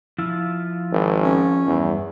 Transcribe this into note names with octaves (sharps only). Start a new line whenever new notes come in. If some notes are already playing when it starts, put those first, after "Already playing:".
F3 E4 F4
G#1
C#4
E2 G2